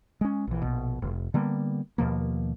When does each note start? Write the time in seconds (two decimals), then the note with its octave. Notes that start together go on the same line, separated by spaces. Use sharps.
0.21 G#3 C#4
0.47 A#1 E3
0.62 A#1 B2
1.02 F1
1.34 D3 G3 A#3 B3
1.98 D#2 B2 F3 A#3